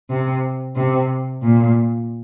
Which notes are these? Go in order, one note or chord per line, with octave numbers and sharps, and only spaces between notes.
C3
C3
A#2